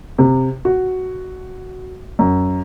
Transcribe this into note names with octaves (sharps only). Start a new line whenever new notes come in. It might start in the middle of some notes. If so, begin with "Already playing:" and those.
C3
F#4
F#2